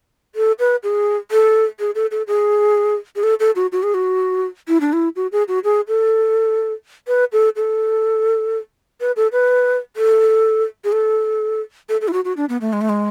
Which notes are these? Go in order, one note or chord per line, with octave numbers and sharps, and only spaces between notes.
A4
B4
G#4
A4
G#4
A4
A4
G#4
G#4
A4
A4
F#4
F#4
G#4
F#4
E4
D4
E4
F#4
G#4
F#4
G#4
A4
B4
A4
A4
B4
A4
B4
A4
G#4
A4
A4
A4
E4
F#4
F#4
D4
B3
A3
G#3
A3
G#3